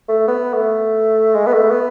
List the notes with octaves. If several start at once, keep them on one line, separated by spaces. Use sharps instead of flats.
A3
B3
A3
G#3
B3
A3
B3